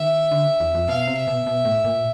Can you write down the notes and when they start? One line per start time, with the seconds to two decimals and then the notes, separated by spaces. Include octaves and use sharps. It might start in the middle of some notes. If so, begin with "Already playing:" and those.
Already playing: D#3 E5
0.31 D3
0.60 E2
0.75 F2
0.88 B2 F5
1.07 C3
1.18 E5
1.27 B2
1.46 B2
1.65 A2
1.84 A#2